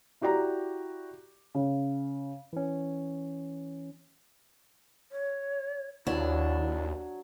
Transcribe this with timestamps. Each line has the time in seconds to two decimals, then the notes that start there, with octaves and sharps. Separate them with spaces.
0.21 E4 F#4 G4 D5 A#5
1.55 C#3
2.53 E3 C#4
5.12 C#5
6.07 D#2 F#3 D4 E4 C#5